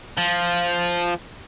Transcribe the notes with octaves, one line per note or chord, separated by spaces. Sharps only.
F3